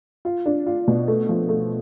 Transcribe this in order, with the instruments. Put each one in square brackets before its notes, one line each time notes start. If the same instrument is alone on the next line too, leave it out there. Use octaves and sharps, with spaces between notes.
[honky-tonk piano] F4
D4
F4
B2
A3
F3
A3